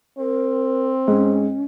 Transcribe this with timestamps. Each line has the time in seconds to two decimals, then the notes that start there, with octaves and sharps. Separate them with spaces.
0.19 C4 A#4
1.08 G#2 C#4